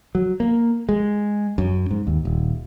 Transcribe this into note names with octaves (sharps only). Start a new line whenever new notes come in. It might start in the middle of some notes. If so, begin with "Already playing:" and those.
F#3
A#3
G#3
F#2
G#2
D#2
D#1